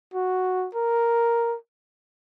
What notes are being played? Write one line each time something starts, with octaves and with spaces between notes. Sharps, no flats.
F#4
A#4